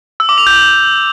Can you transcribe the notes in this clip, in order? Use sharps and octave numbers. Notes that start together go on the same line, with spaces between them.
E6
D6
F7
G6